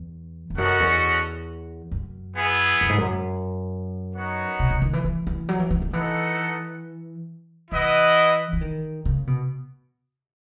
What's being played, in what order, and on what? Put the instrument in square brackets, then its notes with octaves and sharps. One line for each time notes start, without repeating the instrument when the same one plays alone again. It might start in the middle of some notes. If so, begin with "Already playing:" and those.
Already playing: [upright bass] E2
E2
[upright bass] F#2 [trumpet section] C#4 F#4 A4 D#5 F#5
[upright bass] E2
F#2
[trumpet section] B3 E4 G#4
[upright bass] F#2
G#2
F#2
[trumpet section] B3 D#4 F#4 C#5 F#5
[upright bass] B2
C#3
D#3
E3
E3
E3
F#3
E3
E3
D#3
[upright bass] E3 [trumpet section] A3 D#4 A4 D#5 F#5
[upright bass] E3 [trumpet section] E4 B4 D#5 F#5
[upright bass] E3
D#3
C#3
B2